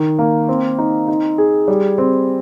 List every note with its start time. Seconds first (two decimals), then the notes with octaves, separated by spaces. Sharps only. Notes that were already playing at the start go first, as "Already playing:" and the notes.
Already playing: D#3
0.19 A#3
0.48 C4
0.78 D#4
1.08 D#4
1.38 G#4
1.68 G3
1.98 C4